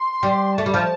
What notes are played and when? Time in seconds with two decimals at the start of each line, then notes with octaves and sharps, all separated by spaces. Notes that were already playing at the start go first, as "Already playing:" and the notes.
Already playing: C6
0.23 G3
0.57 A3 A5
0.66 G3
0.74 F3